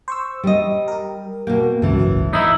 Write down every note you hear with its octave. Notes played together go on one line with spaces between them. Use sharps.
C5 C#6 E6
G3 D#5
G4 A#4
B2 A#3 G5
G1 C#2 A2 E3 F#3
D#4 E4 E5